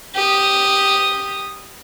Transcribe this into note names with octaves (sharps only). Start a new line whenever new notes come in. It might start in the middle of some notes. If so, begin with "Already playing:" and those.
G4 D#6